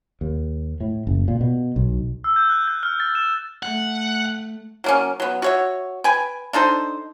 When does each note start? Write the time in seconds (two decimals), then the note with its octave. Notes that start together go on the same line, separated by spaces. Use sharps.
0.21 D#2
0.80 A2
1.07 F#1
1.28 A#2
1.41 B2
1.76 B1
2.24 E6
2.36 G6
2.50 F#6
2.68 G6
2.83 F6
3.00 A6
3.15 E7
3.63 A3 F#5
4.84 F#3 A#3 C#4
5.20 F#3 B3
5.42 F#4 C#5 E5
6.04 B4 G5 G#5
6.53 D4 D#4 A4 C5